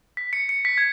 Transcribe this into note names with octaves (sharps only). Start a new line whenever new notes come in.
B6
C#7
C#7
B6
G#6